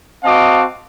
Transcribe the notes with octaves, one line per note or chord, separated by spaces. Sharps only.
C4 F#4 D#5 F5 A5 D6